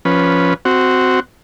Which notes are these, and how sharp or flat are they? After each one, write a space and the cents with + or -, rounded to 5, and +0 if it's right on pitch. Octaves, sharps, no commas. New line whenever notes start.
F3 +0 C#4 +0 B4 -10
C4 -10 F#4 +0